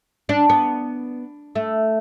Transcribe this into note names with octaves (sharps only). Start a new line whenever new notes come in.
D4
B3
A3